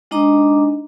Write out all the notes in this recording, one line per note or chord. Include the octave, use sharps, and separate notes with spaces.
G#3 D4 D#4 D#5 A#5 D6